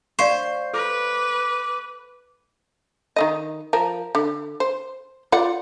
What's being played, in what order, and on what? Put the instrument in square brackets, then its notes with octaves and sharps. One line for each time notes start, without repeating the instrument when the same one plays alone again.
[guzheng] C5 [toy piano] D5 F5 C#6
[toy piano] A4 [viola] B4 [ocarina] D6
[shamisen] D#3 C4 D#5
F3 A#4
D3
C5
F4 D5 F#5